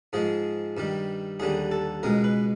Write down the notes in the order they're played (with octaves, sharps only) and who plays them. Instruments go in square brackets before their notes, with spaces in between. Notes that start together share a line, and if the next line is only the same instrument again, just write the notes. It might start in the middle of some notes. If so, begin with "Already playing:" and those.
[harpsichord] G#2 F3 G#3 G#4
G2 D#3 G3
D#2 D3 G3 G#4
A4
C#2 B2 G#3 A#4
B4